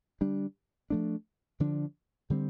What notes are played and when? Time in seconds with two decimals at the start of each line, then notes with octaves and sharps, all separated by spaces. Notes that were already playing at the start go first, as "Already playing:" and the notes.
0.21 D3 G3 D4
0.90 F3 A3 D4
1.60 D3 F3 D4
2.30 D3 G3 C4